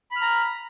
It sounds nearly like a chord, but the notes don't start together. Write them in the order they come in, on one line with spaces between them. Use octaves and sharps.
B5 F6 A#5